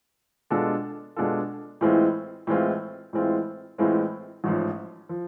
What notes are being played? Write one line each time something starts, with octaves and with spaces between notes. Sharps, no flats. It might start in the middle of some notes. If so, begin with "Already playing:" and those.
B2 G#3 D4 F4 A4
B2 G#3 D4 F4 A4
A2 E3 G#3 C4 F4
A2 E3 G#3 C4 F4
A2 E3 G#3 C4 F4
A2 E3 G#3 C4 F4
A1 G#2 F3
F3